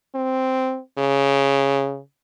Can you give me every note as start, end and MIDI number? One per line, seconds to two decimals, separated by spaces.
0.15 0.79 60
0.98 1.99 49